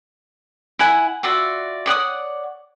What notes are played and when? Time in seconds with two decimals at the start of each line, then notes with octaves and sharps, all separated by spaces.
0.79 E4 F#5 G#5
1.23 F4 F#4 D5 E5
1.86 C#5 D5 F#5 D#6